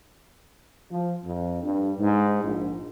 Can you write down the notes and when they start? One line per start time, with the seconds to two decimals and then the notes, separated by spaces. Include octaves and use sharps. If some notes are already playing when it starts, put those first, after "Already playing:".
0.91 F3
1.24 F2
1.63 G2
1.99 G#2
2.43 A#1